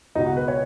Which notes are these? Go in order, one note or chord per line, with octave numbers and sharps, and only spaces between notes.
C#2 B2 D#4
F#4
B4
C#5